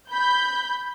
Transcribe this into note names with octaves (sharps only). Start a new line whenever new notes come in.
B5 G6